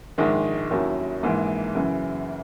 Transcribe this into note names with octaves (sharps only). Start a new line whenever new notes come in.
A#1 G#2 D#3 G#3
D#2 D#3 F#3 C#4 E4
A#1 G#2 E3 A#3
F#2 C#3 E3